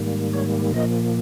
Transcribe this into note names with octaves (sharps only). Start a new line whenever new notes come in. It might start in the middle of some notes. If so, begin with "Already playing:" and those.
Already playing: G#2 D#3 G3 A#3
C#5
A#2 F3 A#3 D#5